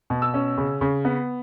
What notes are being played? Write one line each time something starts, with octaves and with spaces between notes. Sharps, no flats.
B2
E6
C#4
C#3
C#3
B3